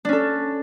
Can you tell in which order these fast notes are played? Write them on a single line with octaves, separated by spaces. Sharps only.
D4 C#4 A4